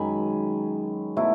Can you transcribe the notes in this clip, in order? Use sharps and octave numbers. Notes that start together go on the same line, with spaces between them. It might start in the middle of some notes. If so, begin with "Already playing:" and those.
Already playing: F#2 D#3 G#3 G#5 B5
B2 F#3 A3 E4